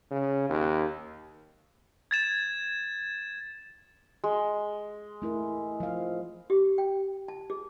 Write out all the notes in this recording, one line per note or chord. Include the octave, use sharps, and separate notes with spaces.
C#3
D#2
G#6 A6 E7
G#3
A3 E4 A#4
F3 F5
G4
G5
A5
G#4